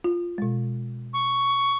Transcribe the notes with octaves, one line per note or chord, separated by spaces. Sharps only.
F4
B2 G#3
C#6